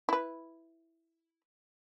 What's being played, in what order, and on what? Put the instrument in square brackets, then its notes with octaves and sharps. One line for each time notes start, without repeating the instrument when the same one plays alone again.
[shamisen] E4 B4